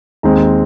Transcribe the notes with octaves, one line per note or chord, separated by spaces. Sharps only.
D#2 D#3 G#3 C4 A#5